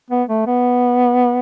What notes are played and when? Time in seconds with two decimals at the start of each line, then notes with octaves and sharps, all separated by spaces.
0.10 B3
0.29 A3
0.47 B3